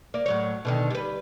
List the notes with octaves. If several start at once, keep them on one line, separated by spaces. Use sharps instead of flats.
A#3 D5
A2 F#3 C#5
B2 D3 D#3
G3 B4